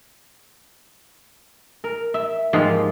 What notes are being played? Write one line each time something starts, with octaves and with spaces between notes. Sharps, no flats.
A#4
E5
G#2 F3 A#3 G4